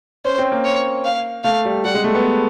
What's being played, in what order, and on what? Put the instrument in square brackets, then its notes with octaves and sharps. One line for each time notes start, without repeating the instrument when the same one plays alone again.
[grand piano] C#4 [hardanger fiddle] C5
[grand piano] C4
A#3
[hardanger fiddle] C#5
F5
[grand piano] A3 [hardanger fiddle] F5
[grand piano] G3
[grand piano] G3 [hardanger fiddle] F#5
[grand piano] G#3
A3
B3